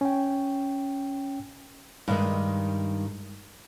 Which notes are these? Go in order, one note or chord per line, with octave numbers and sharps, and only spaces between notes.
C#4 G5
G2 D#3 G#3